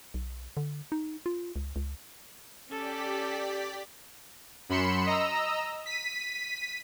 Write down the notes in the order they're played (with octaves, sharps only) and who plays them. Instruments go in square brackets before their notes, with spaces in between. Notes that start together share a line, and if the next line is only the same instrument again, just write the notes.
[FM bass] B1
D3
D#4
F4
C#2
C#2
[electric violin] C#4 A4 [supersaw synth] G4 D5 B6
[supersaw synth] F#2 B5 C6 C#7 E7
D#5 A#5 E6
B6 D#7